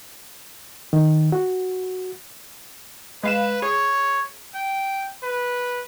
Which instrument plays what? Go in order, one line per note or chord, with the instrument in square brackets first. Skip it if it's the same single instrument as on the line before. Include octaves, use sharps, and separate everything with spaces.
[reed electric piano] D#3
F#4
[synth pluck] G#3 F5 E7 [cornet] B4
[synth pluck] G#4 [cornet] C#5
[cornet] G5
B4